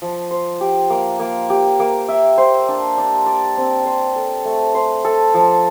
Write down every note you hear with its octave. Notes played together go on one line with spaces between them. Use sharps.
F3
C5
G4
A#3
A#3
G4
A#3
E5
C5
D4
D4
D5
C4
C5
A4
A3
C5
A4
F3